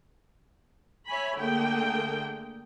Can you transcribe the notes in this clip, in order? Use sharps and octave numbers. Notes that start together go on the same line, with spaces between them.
C#5 E5 G#5 B5
D3 A3 A#3 G#4 G5